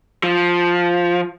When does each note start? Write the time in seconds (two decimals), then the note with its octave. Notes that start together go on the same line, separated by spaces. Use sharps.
0.23 F3